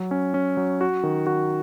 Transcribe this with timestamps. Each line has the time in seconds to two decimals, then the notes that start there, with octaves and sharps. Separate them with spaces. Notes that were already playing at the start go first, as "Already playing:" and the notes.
Already playing: F#3
0.11 C#4
0.34 C#4
0.57 F#3
0.81 F#4
1.03 D#3
1.27 F#4